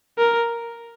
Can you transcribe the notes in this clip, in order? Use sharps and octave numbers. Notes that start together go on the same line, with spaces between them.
A#4